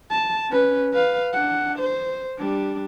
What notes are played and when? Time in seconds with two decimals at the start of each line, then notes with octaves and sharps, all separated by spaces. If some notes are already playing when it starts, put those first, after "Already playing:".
0.11 A5
0.50 C#4 B4
0.93 B4 F5
1.33 D4 F#5
1.79 C5
2.39 G3 D4